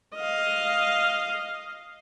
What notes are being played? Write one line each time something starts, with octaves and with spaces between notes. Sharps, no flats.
D#5 F5